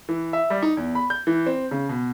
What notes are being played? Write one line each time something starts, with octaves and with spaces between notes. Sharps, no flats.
E3
E5
G3
D#4
E2
B5
G6
E3
C4
C#3
B2